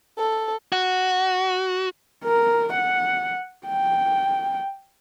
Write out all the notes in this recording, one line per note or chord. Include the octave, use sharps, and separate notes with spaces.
A4
F#4
A#4
F#5
G5